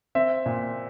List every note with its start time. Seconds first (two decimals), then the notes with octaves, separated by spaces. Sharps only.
0.15 C4 E5
0.46 A#2